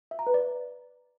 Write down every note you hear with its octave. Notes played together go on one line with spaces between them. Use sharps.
E5
A#5
B4
D5